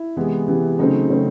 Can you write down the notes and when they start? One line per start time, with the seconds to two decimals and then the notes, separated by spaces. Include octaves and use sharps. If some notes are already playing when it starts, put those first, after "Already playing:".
Already playing: E4
0.16 C3 E3 G#3 B3
0.48 C3 E3 G#3 B3
0.79 C#3 F#3 A3 C4 D#4
1.10 C#3 F#3 A3 C4